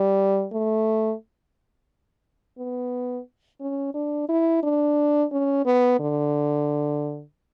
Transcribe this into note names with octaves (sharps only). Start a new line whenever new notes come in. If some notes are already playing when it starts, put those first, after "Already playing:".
Already playing: G3
A3
B3
C#4
D4
E4
D4
C#4
B3
D3